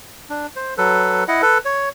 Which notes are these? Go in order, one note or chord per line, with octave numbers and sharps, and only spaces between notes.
D4
C5
F#3 A4 B4
E4 D#5 F#5
A4 B4
C#5